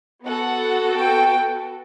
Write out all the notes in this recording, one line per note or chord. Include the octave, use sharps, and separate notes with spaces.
B3 F#4 A4 F#5
G5